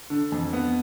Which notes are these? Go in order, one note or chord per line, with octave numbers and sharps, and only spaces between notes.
D3
F2
B3